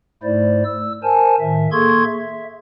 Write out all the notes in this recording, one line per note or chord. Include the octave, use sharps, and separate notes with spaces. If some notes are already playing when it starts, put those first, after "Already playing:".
G#2 A3 E4 C5 D5
E6
A#4 C5 G#5 A5
A2 D#3 E5
A#3 G#4 A4 C6 C#6 G#6
E5